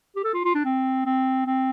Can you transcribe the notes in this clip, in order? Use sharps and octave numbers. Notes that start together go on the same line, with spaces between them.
G4
A4
F4
F4
D4
C4
C4
C4